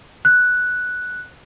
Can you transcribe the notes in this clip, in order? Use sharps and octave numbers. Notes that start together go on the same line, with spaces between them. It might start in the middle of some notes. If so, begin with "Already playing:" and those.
F#6